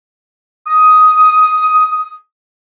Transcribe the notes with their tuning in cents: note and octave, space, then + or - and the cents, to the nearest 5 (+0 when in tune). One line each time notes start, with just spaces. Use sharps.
D#6 +10